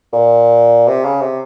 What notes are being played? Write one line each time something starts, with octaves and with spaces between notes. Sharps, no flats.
A#2
C3
C#3
C3